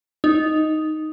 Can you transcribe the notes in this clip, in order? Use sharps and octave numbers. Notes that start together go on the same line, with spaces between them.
D#4